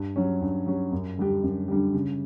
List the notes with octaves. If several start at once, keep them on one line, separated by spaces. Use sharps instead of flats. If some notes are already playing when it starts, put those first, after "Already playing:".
Already playing: G2
F#3 C#4
G2
F#3 C#4
F#2
D3 G3 D4 G4
F#2
D3 G3 D4 G4
C#3